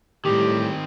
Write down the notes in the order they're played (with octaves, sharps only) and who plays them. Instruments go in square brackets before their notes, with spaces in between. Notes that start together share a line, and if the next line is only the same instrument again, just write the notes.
[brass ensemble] A2 G3 [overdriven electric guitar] D#3 C4 [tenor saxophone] G4